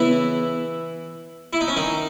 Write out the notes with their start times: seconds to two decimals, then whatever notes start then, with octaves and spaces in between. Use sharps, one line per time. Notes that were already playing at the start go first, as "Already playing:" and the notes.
Already playing: C#3 E3 B3 E4
1.53 E4
1.61 D#4
1.68 C#4
1.76 D#3 D#4